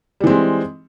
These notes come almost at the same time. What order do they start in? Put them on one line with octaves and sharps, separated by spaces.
G3 E3 C4 G#3